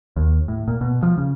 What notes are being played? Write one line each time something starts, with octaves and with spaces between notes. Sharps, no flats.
D#2
A2
A#2
B2
F3
C#3